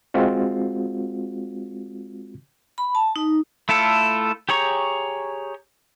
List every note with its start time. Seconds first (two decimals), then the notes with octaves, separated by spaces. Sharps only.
0.14 G#3 C4 F4 F#4
2.78 B5
2.95 A5
3.16 D#4
3.69 A3 E4 F4 A4
4.49 G4 G#4 C#5 A#5 C#6